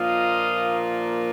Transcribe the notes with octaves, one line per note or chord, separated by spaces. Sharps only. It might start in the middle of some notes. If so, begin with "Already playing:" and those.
Already playing: A#2 F3 A#3 D4 F4 D#5 F5